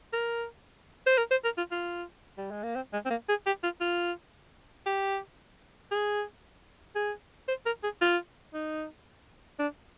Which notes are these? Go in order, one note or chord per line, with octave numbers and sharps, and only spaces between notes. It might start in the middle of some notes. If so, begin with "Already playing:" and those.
A#4
C5
A#4
C5
A#4
F4
F4
G3
G#3
A#3
C4
G#3
C4
A#3
G#4
G4
F4
F4
G4
G#4
G#4
C5
A#4
G#4
F4
D#4
D4